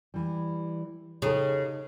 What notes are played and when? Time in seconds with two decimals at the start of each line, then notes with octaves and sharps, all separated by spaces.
0.14 E3 G3
1.22 C#3 D#4 G4 A4